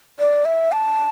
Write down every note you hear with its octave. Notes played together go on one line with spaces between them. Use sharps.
D5
E5
A5